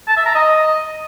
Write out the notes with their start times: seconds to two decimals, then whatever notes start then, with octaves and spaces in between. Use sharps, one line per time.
0.08 A5
0.17 E5
0.26 A#5
0.35 D#5